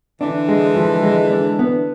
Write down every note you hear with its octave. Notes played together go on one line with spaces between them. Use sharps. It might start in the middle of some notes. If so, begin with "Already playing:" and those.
D3 E3 D4
G#3
F3
G#3
D4
B3